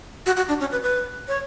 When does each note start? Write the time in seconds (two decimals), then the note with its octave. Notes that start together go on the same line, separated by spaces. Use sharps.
0.26 F#4
0.37 F#4
0.48 D4
0.60 C#4
0.72 B4
0.83 B4
1.28 C#5